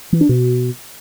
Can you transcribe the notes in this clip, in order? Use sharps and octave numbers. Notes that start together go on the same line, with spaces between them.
E3
D4
B2